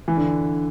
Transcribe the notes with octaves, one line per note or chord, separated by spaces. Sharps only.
E3
D3